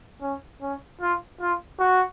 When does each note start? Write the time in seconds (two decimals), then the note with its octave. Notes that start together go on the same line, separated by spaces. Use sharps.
0.22 C#4
0.62 C#4
1.01 F4
1.41 F4
1.80 F#4